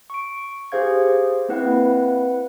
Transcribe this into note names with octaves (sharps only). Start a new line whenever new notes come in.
C#6 D7
G4 G#4 C5 F5 G#6
A#3 C4 E4 B4 F#5